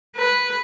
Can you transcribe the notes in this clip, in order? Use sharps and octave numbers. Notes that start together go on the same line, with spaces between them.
B4